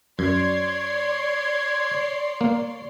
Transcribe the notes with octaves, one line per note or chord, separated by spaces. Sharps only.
F#2 C#5 D5 C6 G#6
A#3